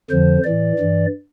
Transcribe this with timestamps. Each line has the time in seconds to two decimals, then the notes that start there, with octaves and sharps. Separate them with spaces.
0.10 F2 D3 F3 C5
0.44 A2 E3 D5
0.79 G2 E3